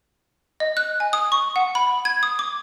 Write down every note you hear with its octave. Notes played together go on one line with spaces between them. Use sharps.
D#5
F#6
G#5
D#6
C#6
F#5
B5
G#6
D#6
D6